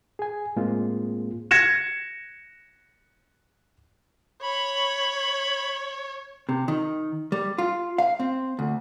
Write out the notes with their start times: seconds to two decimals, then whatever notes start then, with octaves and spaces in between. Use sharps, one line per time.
0.19 G#4 G#5
0.56 A2 G#3 A#3 C4 F4 G#4
1.51 G#6 A#6 C#7 E7
4.42 C#5 B5
6.49 C3
6.68 D#3
7.32 G3
7.58 F4
7.98 F5
8.19 C4
8.59 D2